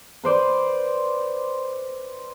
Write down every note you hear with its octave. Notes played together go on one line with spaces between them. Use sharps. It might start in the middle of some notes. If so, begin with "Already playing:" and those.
B4 C5 D5